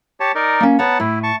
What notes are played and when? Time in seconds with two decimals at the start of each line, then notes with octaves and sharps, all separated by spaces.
0.20 G4 C#5 A5
0.35 D#4 A#4 D5
0.60 A#3 C#4
0.79 B3 C#5 F#5 A5 A#5
1.00 A2 E4
1.23 A5 C#6